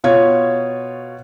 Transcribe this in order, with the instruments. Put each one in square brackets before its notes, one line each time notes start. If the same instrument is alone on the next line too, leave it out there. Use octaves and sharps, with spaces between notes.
[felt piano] B2 F4 C#5 G#6